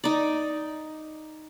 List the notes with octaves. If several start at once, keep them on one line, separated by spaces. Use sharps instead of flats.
D#4 D5